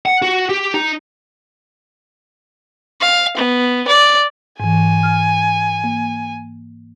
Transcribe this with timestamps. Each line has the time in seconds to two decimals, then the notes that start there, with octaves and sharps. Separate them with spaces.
0.06 F#5
0.22 F#4
0.49 G4
0.74 D#4
3.00 F5
3.37 B3
3.87 D5
4.60 G#2 E3 G#5
5.03 F6
5.84 A#3